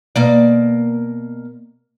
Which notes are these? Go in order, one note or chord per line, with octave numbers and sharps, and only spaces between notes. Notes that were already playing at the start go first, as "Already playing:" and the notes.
B2 A#3 D5